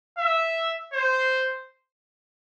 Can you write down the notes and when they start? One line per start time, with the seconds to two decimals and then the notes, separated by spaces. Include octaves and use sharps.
0.18 E5
0.93 C5